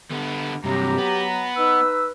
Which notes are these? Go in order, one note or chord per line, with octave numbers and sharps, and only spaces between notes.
D3 B3
G2 C3 F#3 G4 A#5
B3
D#4 B4 E6